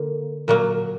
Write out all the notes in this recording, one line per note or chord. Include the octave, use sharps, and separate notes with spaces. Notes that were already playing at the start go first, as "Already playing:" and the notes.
Already playing: D3 A#3
A#2 F#3 A#3